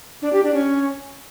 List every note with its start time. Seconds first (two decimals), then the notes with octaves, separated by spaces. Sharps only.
0.22 D4
0.33 G4
0.43 D4
0.54 C#4